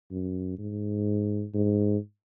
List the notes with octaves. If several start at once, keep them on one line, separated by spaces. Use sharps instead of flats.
F#2
G#2
G#2